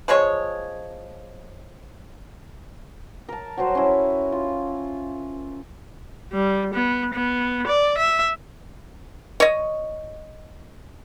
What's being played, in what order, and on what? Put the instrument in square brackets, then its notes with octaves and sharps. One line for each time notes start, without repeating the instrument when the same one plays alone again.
[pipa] F3 G#3 G#4 C#5
[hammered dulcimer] A#4 A5
F#3 G3 F#4 C5
C#4 E4
F4
[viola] G3
B3
B3
D5
E5
[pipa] C#5 D#5